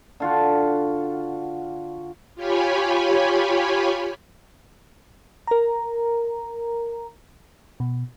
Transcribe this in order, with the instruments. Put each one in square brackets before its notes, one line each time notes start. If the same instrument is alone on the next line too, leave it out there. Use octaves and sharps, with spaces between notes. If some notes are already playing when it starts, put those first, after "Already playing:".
[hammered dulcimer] D3 F4 F#4
[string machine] F4 G4 C#5 G#5 B5
[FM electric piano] A#4 A#5
B2